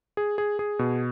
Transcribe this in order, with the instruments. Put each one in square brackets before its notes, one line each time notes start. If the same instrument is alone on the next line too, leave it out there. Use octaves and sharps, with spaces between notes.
[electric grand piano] G#4
G#4
G#4
B2